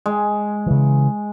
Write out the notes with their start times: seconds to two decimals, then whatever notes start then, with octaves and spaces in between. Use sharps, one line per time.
0.06 G#3
0.66 C#3 E3